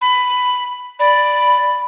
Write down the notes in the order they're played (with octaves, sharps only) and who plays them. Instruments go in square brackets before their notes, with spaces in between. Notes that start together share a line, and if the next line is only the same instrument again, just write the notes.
[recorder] B5
[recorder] D5 [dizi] B5